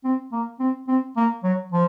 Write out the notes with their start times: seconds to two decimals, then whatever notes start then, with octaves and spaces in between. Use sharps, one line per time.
0.04 C4
0.32 A#3
0.59 C4
0.88 C4
1.17 A#3
1.44 F#3
1.72 F3